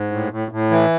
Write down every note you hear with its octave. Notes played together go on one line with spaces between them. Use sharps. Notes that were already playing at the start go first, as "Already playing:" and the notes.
Already playing: G#2
A2
A2
A2
E3